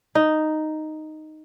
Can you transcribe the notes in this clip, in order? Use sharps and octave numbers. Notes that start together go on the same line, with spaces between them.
D#4